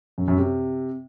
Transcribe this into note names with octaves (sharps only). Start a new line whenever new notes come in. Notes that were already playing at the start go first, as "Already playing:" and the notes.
F#2
F#2
C3